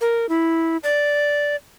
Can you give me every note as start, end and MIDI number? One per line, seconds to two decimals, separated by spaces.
0.01 0.29 70
0.29 0.77 64
0.83 1.56 74